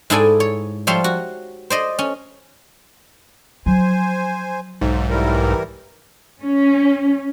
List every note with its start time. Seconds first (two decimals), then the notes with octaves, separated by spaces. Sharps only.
0.10 G#2 E4 G#4 A4 D5 G#5
0.40 C#5
0.87 F3 G3 C#5 E5 F5 C6
1.04 F#4
1.70 C5 D5 D#5
1.99 C#4
3.66 F3 F#3 C5 G#5
4.81 B1 G#2
5.10 E3 G3 A#4
6.42 C#4